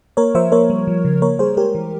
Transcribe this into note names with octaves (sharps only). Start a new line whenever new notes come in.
A#3 A#4 C#5
F3 C5 E5
A#3 A#4 C#5
G3
F3
C#3
A#3 A#4 C#5
G3 G#4 C5
G#3 G4 A#4
E3